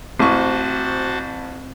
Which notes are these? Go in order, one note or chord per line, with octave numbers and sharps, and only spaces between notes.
A1 C4 F#4 C5 A5 C#6